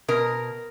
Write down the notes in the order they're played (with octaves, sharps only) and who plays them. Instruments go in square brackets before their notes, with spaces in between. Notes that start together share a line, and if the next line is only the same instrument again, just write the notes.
[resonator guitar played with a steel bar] B2 A#4